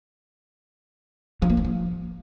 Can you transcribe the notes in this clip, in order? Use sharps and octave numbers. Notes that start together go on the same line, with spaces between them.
F3
A#3
D#3
F3